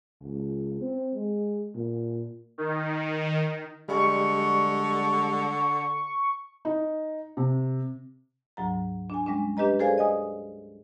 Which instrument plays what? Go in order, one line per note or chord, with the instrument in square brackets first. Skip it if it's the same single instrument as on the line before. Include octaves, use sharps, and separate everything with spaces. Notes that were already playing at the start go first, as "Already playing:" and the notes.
[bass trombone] C#2
C4
G#3
A#2
[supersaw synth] D#3
[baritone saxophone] D3 [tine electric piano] G3 G#3 [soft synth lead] C#6
[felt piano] D#4
C3
[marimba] D2 G#2 F#3 A#5
D4 G#5
G3 G#3 C#4 D4
D4 G4 B4 D#5 A#5
G#4 A4 C5 D5 F5 G#5
D#5 G#5 D#6